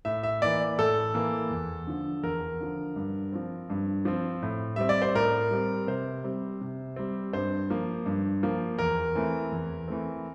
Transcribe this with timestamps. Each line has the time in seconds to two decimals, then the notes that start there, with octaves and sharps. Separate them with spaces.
0.05 A2 E5
0.23 E5
0.42 E3 A#3 D5
0.78 A2 A4
1.14 E3 A#3
1.50 E2
1.87 D3 F3
2.23 E2 A#4
2.61 D3 F3
2.96 G2
3.32 F3 C4
3.70 G2
4.05 F3 C4
4.43 A2
4.76 G3 C4 E5
4.89 D5
5.02 C5
5.15 A2 A#4
5.51 G3 C4
5.87 C3 C5
6.24 G3 C4
6.61 C3
6.96 G3 C4
7.33 G2 C5
7.70 F3 A#3
8.06 G2
8.43 F3 A#3
8.79 E2 A#4
9.15 E3 A3 C4
9.52 E2
9.88 E3 A3 C4